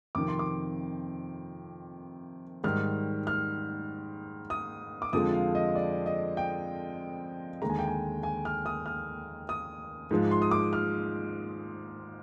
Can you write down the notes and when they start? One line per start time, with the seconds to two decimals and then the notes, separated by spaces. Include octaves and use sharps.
0.15 F2 C3 D#3 D6
0.28 C6
0.39 D6
2.64 G#2 D#3 G3 F6
3.27 F6
4.50 D#6
5.02 D6
5.13 F2 D3 F3 G#3 D#6
5.33 F5
5.55 D#5
5.75 D5
6.06 D#5
6.37 G5
7.62 D#2 D3 G#3 A#5
7.70 G#5
7.79 G5
7.87 G#5
8.23 G#5
8.45 F6
8.66 D#6
8.86 F6
9.49 D#6
10.11 G#2 F3 G#3
10.31 C6
10.42 D#6
10.51 D6
10.73 F6